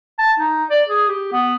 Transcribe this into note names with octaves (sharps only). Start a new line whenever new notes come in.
A5
D#4
D5
G#4
G4
B3